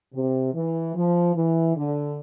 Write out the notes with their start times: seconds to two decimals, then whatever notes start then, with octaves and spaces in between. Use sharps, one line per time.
0.14 C3
0.54 E3
0.95 F3
1.36 E3
1.76 D3